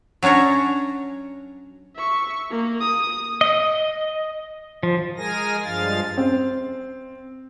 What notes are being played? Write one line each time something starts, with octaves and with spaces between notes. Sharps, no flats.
F#3 C#4 D4 C#5 A#5
E5 C#6
A#3
D#6
D#5
F3
G#3 G#4 A#4 G#5 A#6
G2 F3 G#3 F5 A6
C4